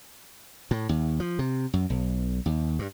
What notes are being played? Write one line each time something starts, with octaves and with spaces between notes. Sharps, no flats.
A2
D#2
F3
C3
F#2
B1
D#2
G2